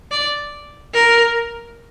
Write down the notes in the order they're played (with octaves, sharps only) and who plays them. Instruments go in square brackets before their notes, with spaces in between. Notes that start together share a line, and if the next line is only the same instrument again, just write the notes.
[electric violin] D5
A#4